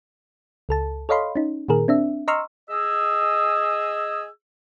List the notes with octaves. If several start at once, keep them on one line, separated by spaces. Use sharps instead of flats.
C#2 A4 A5
A4 C#5 D#5 F5 B5 C6
C#4 D#4
A#2 D#3 G#4 A#4
C4 D4 E5
D#5 A#5 C6 C#6 E6 F6
G#4 D#5 E6